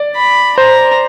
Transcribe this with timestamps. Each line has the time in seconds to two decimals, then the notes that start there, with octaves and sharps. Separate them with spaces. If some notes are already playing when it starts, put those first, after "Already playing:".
Already playing: D5
0.16 B5
0.57 C5 A#5